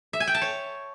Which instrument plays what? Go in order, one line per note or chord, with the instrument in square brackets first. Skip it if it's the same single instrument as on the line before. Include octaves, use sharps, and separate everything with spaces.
[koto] E5
G#5
G5
A5
C#5